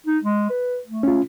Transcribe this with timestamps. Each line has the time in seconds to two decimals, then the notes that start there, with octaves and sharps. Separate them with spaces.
0.06 D#4
0.24 G#3
0.50 B4
0.86 A3
1.03 C#4 F4